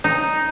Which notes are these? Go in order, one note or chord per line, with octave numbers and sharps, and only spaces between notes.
D#4